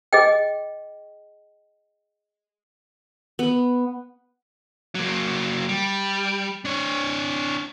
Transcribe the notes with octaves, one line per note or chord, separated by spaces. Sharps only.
G#4 D#5 G5
B3
F#3 A#3
G3
D4 C#5